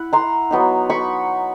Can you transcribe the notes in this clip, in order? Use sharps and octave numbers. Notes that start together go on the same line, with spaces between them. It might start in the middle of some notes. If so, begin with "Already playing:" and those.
Already playing: E4 F#5
A#5 C6
F#3 B3 D#4
B5 C#6